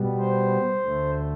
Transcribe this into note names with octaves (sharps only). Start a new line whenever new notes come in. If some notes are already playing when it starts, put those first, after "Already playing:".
Already playing: B2 G3 B3
C5
D2 D3 A3